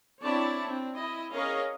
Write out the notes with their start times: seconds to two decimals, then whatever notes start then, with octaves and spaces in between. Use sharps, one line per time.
0.22 C4 D4 E4 C#5 D5 A5
0.65 C4 D4
0.94 E4 D#5
1.32 C#4 G#4 A#4 C#5 D#5 F5